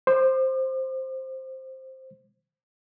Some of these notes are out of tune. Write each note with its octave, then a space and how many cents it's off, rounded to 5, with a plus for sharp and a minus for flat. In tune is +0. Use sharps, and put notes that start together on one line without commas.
C5 +5 D6 +45